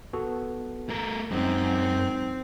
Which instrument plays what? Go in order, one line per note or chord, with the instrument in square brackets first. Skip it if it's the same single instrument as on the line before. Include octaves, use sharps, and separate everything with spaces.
[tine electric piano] B3 F#4 A4
[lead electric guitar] A3 A#4
[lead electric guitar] F#2 [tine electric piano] G#3 D#4 [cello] C4